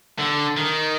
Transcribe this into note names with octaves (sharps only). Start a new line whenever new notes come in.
D3
D#3